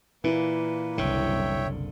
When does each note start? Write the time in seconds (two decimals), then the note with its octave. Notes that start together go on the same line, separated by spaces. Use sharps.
0.24 A#2 E3 A#3 B4
0.98 F#1 C2 D3 C#5 E5 G5